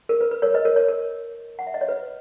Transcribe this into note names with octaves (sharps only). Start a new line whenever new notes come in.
A#4
B4
B4
A#4 C#5
B4 D#5
A#4 C#5
A#4 C#5
A#4
F#5
E5
D#5
C#5
B4